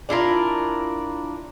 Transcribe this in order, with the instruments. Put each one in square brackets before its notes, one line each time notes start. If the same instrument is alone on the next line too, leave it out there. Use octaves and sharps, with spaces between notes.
[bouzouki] D4 E4 F4 A#4